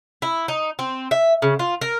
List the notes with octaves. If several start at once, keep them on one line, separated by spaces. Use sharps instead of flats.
E4
D#4
C4
E5
C#3
F4
A#4